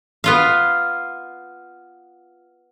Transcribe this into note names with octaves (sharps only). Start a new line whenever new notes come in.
B3 F4 F5